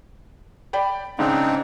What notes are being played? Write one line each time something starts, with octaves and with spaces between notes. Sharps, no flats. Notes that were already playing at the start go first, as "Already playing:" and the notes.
D5 G5 B5
G#2 C#3 C4 D4 D#4